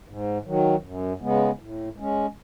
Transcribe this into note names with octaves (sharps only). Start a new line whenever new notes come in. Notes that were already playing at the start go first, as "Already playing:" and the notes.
G#2
D#3 F#3
F#2
C#3 G#3 B3
A2
G#3 C#4